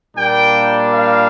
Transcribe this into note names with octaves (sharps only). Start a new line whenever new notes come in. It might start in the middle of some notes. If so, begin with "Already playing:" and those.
A#2 G3 A#3 D4 G5
F5